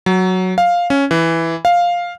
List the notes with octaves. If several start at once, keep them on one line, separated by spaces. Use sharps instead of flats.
F#3
F5
C#4
E3
F5